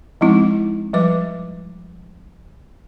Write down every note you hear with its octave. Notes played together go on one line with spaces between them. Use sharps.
F3 G#3 C4 D#4 E4
F3 G3 B4 D6